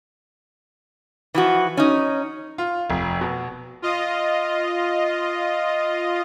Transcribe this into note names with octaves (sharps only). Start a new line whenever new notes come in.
E3 F3 F#4
C#4 D#4
F4
F1
B2
F4 D#5